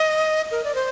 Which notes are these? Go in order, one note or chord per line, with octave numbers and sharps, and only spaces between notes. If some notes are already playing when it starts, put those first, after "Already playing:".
Already playing: D#5
A#4
D5
C5